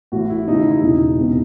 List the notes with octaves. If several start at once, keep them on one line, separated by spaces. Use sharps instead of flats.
A1 A2 E3 F#4
E4
D#2 C#3 E3 D#4
E4
E4
E1 E2 C#3 E3 D#4
E1 E2 C3